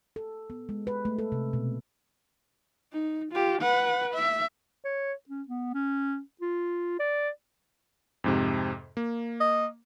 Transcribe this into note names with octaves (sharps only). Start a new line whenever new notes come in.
A4
B3
G#3
B4
A3
A4
C3
B2
D#4
F4 G4
B4 F#5
E5
C#5
C#4
B3
C#4
F4
D5
F2 G#2 C3
A#3
D#5